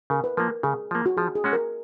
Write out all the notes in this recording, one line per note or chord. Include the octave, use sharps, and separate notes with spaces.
C#3 A#4
B4
F3 A#3 A#4
C#3 G#4
F3 A#3
F#4
F3 G#4
G#4
G#3 C#4 F#4
A#4